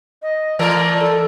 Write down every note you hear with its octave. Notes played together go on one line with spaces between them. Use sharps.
D#5
E3 A3 A#4 D5
A4